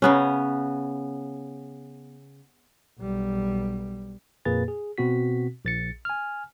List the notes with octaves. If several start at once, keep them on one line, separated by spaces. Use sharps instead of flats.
C#3 B3 C#4
B1 G3
F2 A#2 A#3 G#4 B4 A6
G#4
B2 C4 F#4 B6
A#1 A6 C#7
G#5 F6